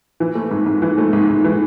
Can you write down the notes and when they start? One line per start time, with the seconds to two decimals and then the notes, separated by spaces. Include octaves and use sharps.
0.20 E3
0.35 A3
0.51 G#2
0.66 G#2
0.82 E3
0.98 A3
1.13 G#2
1.28 G#2
1.44 E3